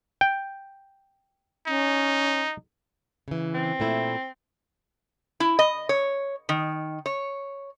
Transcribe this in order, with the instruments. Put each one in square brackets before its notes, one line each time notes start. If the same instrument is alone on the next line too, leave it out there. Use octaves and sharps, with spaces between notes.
[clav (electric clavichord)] G5
[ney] C#4 [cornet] D#4
[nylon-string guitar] C#3 E3
[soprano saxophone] C4
[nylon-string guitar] A#2 A3 E4
[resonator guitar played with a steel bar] E4
D#5
C#5
D#3
C#5